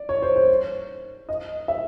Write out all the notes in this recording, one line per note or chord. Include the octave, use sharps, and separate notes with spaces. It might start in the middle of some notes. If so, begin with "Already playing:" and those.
Already playing: D5
C#5
C5
C5
D#5
E5